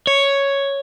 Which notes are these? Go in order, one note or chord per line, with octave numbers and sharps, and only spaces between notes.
C#5